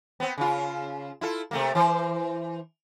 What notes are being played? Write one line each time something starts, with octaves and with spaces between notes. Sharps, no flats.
B3 C4
C#3 F4
E4 F4 A4
C3 A3 A#3
E3 C5